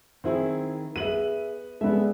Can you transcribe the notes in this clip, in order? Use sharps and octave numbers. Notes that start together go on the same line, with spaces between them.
D#3 C4 E4 G#4
B3 G#4 E5 D#7 F#7
G#3 B3 A4 D5 E5